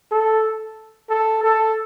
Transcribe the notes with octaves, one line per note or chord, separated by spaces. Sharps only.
A4
A4
A4